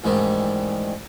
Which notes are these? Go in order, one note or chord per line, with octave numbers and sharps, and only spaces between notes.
A1 G#2 D#3 G3